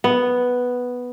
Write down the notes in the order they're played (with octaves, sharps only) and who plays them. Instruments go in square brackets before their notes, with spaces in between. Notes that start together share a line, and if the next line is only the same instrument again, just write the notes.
[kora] B3